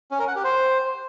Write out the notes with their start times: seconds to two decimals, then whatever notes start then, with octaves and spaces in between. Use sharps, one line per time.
0.11 C#4
0.19 A#4
0.28 F#5
0.36 G4
0.44 C5